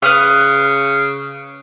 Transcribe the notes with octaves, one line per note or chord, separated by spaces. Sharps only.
C#3 B4 D#6 F6